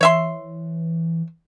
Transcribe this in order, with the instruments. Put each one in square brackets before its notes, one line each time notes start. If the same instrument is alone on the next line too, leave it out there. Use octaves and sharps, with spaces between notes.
[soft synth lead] E3 [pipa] C#5 E5 C6